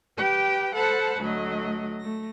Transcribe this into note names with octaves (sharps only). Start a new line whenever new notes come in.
G4 B4 G5
A4 C5 F#5 A5 B5
D2 F#3 A3 D#5
A3 A#6